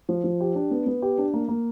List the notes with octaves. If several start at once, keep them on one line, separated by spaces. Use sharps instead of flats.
F3
F3
G4
D4
B3
B3
G4
D4
A#3
A#3